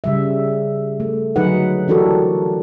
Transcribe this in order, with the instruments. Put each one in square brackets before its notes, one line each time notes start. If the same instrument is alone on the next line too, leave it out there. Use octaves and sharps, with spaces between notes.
[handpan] C#3 G3 E5
A3
D3 F#3 D#4 G#4 B4 F#5
E3 D4 F#4 G4 A4 A#4